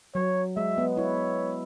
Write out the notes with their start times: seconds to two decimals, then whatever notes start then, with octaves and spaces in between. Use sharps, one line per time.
0.15 F#3 C#5
0.56 G#3 E5
0.78 B3
0.97 E4 C#5